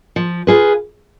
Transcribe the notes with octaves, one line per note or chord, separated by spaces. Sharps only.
F3
F4 G#4 B4